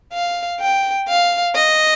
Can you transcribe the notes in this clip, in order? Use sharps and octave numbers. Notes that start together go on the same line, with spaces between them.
F5
G5
F5
D#5